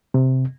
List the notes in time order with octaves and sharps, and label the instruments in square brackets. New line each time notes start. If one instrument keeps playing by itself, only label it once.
[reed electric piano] C3